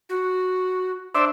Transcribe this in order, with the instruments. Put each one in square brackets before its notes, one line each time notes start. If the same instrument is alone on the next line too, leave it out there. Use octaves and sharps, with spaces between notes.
[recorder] F#4
[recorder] D4 [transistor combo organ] C5 D5 E5